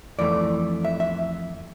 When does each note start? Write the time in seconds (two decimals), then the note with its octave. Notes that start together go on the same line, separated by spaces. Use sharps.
0.18 F2 E3 A3 D5
0.85 E5
1.00 E5